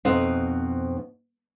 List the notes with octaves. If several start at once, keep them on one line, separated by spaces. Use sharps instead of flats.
F2 B2 C4 D#4